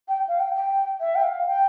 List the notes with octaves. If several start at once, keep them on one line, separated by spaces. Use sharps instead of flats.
G5
F5
G5
G5
E5
G5
F5
G5